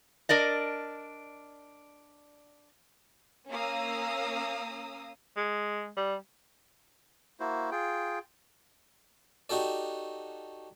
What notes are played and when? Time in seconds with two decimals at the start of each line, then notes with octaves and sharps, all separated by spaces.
0.29 D4 A#4 D5 D#5
3.49 A#3 C#4 F5 A#5 D#6 E6
5.37 G#3
5.97 G3
7.40 A#3 E4 F#4 C5
7.71 F4 G#4 G5
9.49 D#4 F#4 G4 A4 D5